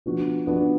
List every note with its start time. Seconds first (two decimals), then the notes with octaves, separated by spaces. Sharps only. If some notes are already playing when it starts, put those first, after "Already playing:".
0.06 F3 B3 D4 F#4
0.47 F3 B3 D4 F#4